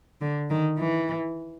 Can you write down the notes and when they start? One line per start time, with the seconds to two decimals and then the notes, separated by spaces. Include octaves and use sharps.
0.21 D3
0.50 D#3
0.79 E3